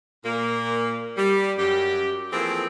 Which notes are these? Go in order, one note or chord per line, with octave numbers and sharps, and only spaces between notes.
A#2 A#3
G3
F#2 G4
E3 F3 A3 A#3 C4 G#4